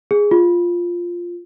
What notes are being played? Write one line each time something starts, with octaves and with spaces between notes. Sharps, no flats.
G#4
F4